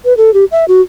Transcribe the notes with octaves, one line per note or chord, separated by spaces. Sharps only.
B4
A4
G4
E5
F#4